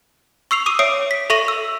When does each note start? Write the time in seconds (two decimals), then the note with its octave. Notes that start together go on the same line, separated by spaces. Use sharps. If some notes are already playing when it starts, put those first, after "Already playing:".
0.51 C#6 E6 C7 F7
0.66 D6 D#6 D#7
0.79 C#5 E5 D#6 C7 D7
1.11 B6
1.30 A4 E5 C#6 A#6 D#7 F#7
1.48 E6